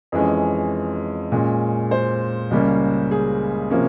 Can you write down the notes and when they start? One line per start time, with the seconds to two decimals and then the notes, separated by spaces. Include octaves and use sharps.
0.12 F2 E3 G#3 C#4
1.32 A#2 G#3 C#4
1.91 C5
2.51 C#2 C#3 G3 A#3 C#4
3.11 G#4
3.70 C3 F3 A#3 C#4